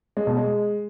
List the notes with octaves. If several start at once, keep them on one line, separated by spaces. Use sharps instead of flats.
G#3
B2
G#3